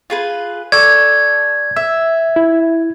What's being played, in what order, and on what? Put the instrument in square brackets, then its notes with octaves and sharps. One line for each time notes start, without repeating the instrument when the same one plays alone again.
[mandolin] F4 G#4 B4
[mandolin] A4 [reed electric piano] D5 C#6 E6 [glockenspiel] G#6
[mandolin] E5 [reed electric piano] E6
[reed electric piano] E4